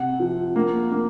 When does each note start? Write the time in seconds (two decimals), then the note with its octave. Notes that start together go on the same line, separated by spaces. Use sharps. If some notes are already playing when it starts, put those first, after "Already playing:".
Already playing: C3 F#5
0.20 F3
0.56 A#3
0.91 A#3